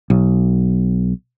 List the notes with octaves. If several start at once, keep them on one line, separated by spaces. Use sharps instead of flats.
B1